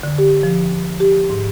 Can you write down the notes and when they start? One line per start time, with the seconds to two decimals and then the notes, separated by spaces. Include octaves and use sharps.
0.03 D3
0.18 G4
0.43 F3
1.00 G4
1.30 G#2